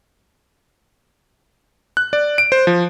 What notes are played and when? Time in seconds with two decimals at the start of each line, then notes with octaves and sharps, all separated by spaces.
1.97 F#6
2.13 D5
2.38 D7
2.52 C5
2.67 F3